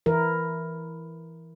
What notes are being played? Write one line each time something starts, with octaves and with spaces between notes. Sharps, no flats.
E3 E4 A#4